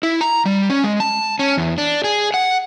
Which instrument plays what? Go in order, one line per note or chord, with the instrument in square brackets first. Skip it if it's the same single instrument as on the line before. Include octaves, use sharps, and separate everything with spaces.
[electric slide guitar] E4
A#5
G3
C#4
G#3
A5
C#4
E2
D4
G#4
F#5